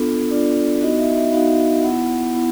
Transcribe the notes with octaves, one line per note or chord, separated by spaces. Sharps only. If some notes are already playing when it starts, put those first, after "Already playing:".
Already playing: B3 D4 F4 A4
B3 D4 F4 D5
B3 D#4 F#4 D#5
E5
E5
B3 D#4 F#4 F5
B3 E4 F#5
B3 E4